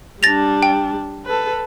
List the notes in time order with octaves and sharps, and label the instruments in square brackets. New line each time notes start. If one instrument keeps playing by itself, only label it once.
[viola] G3 D4 [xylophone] A6 A#6 F7
[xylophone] G5
[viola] A4 B4